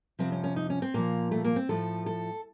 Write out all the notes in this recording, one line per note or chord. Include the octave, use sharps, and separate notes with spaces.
F2 C3 F3 C4
C#4
C#4
D#4
C#4
C4
A#2 F3 A#3
A3
A#3
C4
A2 F3 A4
A4